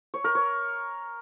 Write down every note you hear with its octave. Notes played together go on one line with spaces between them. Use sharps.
C#5
A#4
C#5